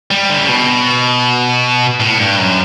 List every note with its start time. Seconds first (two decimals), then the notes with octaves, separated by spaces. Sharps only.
0.11 G3
0.30 D3
0.38 C#3
0.48 B2
2.00 A2
2.19 G2
2.39 F#2